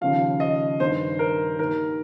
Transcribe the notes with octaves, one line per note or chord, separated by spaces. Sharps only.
D#2 C#3 F3 F5
D#5
G2 D#3 C5
A#4
D#2 D#3 A#4